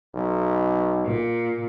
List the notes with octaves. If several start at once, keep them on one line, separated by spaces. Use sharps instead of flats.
B1
A#2